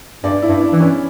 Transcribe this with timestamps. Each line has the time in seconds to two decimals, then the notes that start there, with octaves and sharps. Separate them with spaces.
0.24 G2 D5
0.42 E4
0.48 G2
0.61 D4
0.73 E3
0.80 C#4